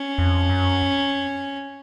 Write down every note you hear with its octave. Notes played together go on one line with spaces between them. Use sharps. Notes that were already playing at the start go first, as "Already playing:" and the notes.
Already playing: C#4
F2
F#2